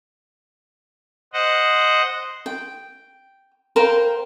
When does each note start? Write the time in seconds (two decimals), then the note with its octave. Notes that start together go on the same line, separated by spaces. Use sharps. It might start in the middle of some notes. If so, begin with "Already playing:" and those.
1.33 C5 D#5 F#5
2.46 G5
3.76 A#4 C5 F5 G5